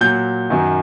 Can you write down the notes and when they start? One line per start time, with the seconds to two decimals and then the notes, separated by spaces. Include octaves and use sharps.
0.01 A#2 F#3 G6
0.50 F#2 D#3 F#3